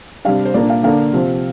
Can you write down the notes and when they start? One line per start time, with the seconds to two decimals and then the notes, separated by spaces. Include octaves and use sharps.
0.25 C3 G3 D4 F5
0.45 C5
0.54 A#2 A#3 D4 D5
0.70 F5
0.83 D3 A#3 D4 F5
1.13 C3 F3 C4